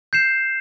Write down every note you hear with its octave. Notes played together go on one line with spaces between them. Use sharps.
G6 C7 E7